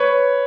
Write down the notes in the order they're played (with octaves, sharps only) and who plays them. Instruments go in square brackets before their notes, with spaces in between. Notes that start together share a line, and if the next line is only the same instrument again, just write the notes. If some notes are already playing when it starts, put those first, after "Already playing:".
Already playing: [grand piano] B4 C#5